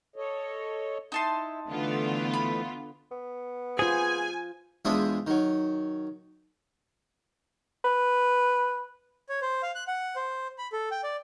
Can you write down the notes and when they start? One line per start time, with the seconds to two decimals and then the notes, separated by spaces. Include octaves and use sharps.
0.16 A4 C#5 D#5
1.12 D#4 E4 A5 C6
1.68 D3 E3 A3 B3 F4
2.34 B5
3.11 B3
3.79 F4 G#4 C5 G#5
4.85 E2 F3 G#3 D4 E5 D#6
5.27 D#3 F#3
7.85 B4
9.29 C#5
9.42 C5
9.63 F5
9.75 F#6
9.88 F#5
10.16 C5
10.58 B5
10.73 A4
10.91 G5
11.03 D5